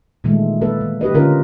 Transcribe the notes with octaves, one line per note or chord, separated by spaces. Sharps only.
A#2 D#3 E3 G#3 A3
A#3 A4 B4
E3
G4 B4 D#5
D3 C#4 F4 A#4